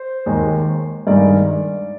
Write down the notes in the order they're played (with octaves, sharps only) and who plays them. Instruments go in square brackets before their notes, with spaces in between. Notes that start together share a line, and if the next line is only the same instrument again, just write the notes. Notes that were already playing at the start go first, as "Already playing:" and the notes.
Already playing: [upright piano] C5
D#2 D#3 G#3
G2 D#3 G#3 D5